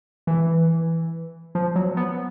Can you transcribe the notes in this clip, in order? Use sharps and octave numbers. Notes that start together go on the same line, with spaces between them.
E3
F3
F#3
B3